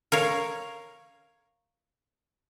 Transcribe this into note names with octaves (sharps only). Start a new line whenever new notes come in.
A#4 C#5 F5